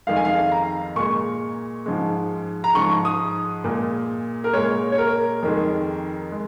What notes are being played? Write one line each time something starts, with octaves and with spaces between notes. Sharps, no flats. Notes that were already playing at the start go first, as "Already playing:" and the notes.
F2 D#3 G#3 F5
G#5
F5
A#5
A#2 G#3 C#6
G#2 F3 G#3
A#5
G#2 F3 G#3 C#6
D#6
A#2 G#3
A#4
A#2 G#3 C#5
C#5
A#4
F2 D#3 G#3
G#3